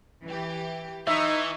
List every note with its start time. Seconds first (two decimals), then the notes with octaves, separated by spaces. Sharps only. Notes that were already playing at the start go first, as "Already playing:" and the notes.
0.24 E3 G4
1.07 E3 D#4 E5 C#6 D#6